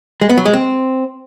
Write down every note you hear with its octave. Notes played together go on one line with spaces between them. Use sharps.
G#3
B3
F#3
G#3
C4